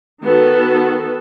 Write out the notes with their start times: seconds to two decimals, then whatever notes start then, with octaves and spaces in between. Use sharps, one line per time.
0.23 D#3 B3 F#4 A4